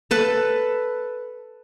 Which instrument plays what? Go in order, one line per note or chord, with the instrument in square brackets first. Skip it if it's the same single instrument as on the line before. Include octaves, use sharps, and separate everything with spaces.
[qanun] A4 B4 A5